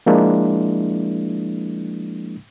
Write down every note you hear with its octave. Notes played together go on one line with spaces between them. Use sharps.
F3 G#3 A#3 D4 E4